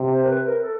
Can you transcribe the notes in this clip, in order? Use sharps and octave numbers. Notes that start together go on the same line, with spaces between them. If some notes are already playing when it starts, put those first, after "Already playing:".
Already playing: C3
C5
A#4
B4
A#4
A4